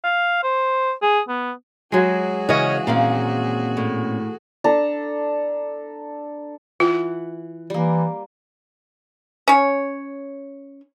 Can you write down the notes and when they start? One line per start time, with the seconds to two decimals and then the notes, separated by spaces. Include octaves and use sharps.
0.04 F5
0.43 C5
1.02 G#4
1.28 B3
1.92 F#3 G#3 F#4 G#4
2.49 C#3 E3 C#4 C#5 D#5
2.87 D#2 A#2 C4 C#4 F5
3.77 A2
4.64 D4 A4 A5 A#5
6.80 E3 F4 F#5
7.70 E3 G3 A#3
9.48 C#4 C#5